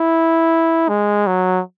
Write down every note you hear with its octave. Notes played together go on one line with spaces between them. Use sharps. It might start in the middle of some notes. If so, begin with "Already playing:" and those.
Already playing: E4
G#3
F#3